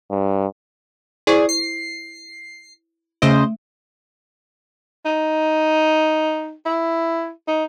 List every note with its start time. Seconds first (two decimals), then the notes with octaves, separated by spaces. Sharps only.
0.11 G2
1.27 E4 G#4 C5 D5 C#6
1.49 C7
3.22 C#3 A3 C5 D#5
5.05 D#4
6.66 E4
7.48 D#4